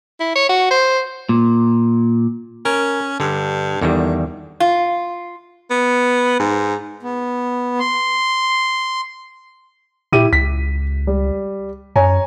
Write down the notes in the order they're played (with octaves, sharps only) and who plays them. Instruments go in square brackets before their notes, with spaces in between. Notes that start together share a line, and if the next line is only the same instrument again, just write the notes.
[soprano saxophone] E4
C#5
F#4
C5
[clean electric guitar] A#2
[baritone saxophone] C#4 [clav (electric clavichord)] A#4
[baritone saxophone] G2 [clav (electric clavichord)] D3
[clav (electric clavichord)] E2 D#3 G3 [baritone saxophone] D3
[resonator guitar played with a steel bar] F4
[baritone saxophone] B3
G#2
[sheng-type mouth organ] B3
C6
[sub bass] A#2 [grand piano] E4 G4 D#7
[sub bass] C#2 [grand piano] B6
[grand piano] G3
[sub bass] F#2 [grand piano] C#5 G#5 A#5